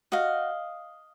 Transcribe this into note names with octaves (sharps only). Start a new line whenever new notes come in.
F#4 D#5 F5